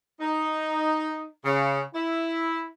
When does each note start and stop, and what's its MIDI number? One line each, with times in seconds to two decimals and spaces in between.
0.21 1.27 63
1.45 1.81 49
1.94 2.66 64